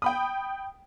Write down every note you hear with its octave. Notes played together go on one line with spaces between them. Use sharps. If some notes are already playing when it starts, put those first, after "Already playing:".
G5 B5 D#6